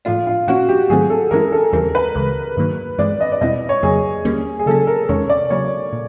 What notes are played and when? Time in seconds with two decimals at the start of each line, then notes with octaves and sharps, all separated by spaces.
0.05 A2 F3 A3 D4 F4
0.27 F4
0.47 A#2 F3 A#3 C#4 E4 F#4
0.69 G4
0.90 G#2 D#3 F#3 A3 C4 G#4
1.10 A4
1.31 G2 E3 G#3 C#4 E4 A#4
1.52 A4
1.73 D#2 C#3 E3 G3 C4 A#4
1.95 B4
2.15 D2 C#3 E3 G#3
2.57 G2 D#3 F#3 A#3
2.98 G2 E3 G#3 C4 D5
3.21 D#5
3.32 D5
3.41 E2 B2 G3 C4 E4 D#5
3.69 C#5
3.83 F2 C#3 F#3 A#3 G#4
4.25 D#2 D3 G3 A#3 C#4
4.59 G#4
4.66 C#3 F#3 A#3 C#4 A4
4.87 A#4
5.09 E2 C3 D#3 G#3 C#4 C#5
5.30 D5
5.50 C#3 F#3 A#3 C#5
5.93 A#2